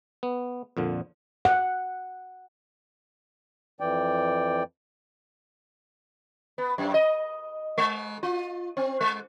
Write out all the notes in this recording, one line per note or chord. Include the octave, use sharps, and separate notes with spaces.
B3
F2 A#2 D3
F#5
F2 E3 D5 G5
B3
F#2
D#5
G#3
F4
C4
G#3